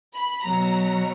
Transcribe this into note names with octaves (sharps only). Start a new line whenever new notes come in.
B5
B2 F#3 A#5